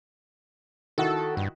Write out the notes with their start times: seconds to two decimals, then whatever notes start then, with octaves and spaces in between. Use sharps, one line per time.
0.98 D#3 E4 F#4 A4
1.37 G2